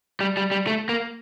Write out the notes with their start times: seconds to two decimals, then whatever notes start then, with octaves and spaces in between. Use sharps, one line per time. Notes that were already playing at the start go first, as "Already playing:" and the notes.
0.21 G3
0.37 G3
0.51 G3
0.67 A3
0.89 A#3